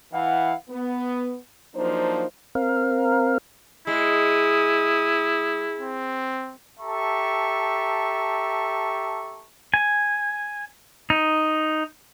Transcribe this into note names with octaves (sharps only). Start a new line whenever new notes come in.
E3 E4 F5 F#5
B3
F3 F#3 A#3 D4 D#4 C5
C4 A#4 F5
G#3 E4 D#6
C4
G4 A4 E5 A5 A#5 C#6
G#5
D#4